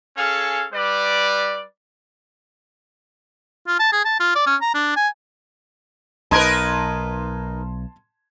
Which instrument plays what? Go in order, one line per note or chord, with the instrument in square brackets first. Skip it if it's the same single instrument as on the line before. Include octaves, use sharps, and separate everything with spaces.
[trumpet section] C#4 G#4 A4 F5
G3 B4 D5
[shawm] F4
A5
G#4
A5
F4
D5
C#4
A#5
D4
G#5
[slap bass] B1 [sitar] D#4 A#4 B4 [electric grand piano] A5 C6 G#6